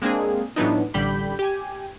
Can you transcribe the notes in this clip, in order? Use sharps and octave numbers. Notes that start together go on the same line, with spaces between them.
G#3 A#3 C4 D4 G#4
A2 E3 F#3 B3 D4 D#4
A1 D3 G3 G4 B5 G6
G4 G#5